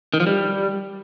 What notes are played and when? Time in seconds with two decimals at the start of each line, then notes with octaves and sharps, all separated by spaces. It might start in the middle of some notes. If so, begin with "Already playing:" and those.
0.14 D#3
0.20 F3
0.27 G3